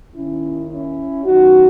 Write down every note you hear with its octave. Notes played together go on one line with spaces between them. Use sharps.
D#2 D#3 C#4 E4
C#4 E4
F#2 D#3 D#4 F#4